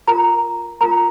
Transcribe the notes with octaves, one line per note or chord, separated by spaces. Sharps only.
F4 A#4 A#5
F4 A#4 A#5